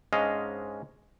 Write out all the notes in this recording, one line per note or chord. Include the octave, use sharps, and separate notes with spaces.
G#2 G#3 C#4 D4 D#5 F5